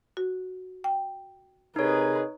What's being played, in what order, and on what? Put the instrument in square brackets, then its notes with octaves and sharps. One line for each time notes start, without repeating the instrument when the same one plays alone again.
[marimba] F#4
G5
[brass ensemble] C3 G#4 A#4 [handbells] D#4 C#5 [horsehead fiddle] B4 D#5